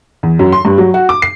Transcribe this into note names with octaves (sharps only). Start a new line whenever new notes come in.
E2
F#2
C6
G2
F#3
F#4
D6
C7